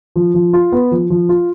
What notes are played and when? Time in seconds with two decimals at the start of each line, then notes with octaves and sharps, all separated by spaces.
0.16 F3
0.34 F3
0.53 F4
0.72 B3
0.91 F3
1.10 F3
1.29 F4